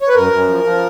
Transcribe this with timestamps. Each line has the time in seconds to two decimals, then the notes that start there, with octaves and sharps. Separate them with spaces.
0.02 C#5
0.08 B4
0.15 F#2 A#4
0.33 F#2
0.49 F3
0.64 F3